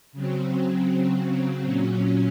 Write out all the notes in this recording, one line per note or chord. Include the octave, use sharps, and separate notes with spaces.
C#3 F#3 C4
A#2 F#3 C#4